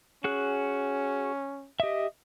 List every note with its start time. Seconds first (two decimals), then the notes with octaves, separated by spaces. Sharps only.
0.24 C#4 F#4 G#4 F#6
1.80 G4 D#5 E5